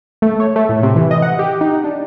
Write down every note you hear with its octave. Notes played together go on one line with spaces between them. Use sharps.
A3
C#5
A3
A2
C3
E3
D#5
F#5
G4
D#4
D4